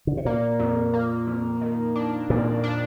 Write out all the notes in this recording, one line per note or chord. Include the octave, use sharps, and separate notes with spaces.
D3
C3
A#2 A#3
F2
A#3
F2
D#3
D4
F2 A#2
D4